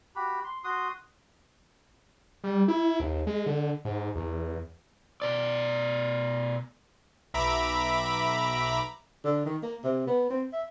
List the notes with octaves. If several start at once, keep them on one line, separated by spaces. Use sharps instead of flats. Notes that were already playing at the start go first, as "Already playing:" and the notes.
F#4 G4 B5
C6
F#4 C6 D#6
G3
E4
D#2
G#3
D3
G#2
E2
B2 D5
B1 E5 A#5 B5 D6
D3
D#3
A#3
C3
B3
C4
E5